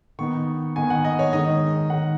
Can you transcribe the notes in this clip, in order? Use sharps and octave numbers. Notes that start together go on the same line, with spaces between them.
D#3 B3 D#4 C#6
D#3 B3 D#4 G#5
F#5
D#5
C#5
D#3 G#3 D#4 D#5
D#3 G#3 D#4 F#5